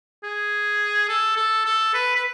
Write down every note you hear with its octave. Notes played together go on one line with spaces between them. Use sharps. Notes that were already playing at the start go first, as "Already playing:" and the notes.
G#4
A4
A4
A4
B4
B4